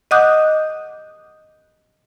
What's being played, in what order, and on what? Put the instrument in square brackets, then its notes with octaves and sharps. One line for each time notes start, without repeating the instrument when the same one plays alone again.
[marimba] D#5 F#5 D6 D#6 F#6 G6